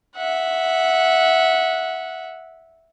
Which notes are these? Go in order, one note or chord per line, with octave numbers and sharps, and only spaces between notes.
E5 F#5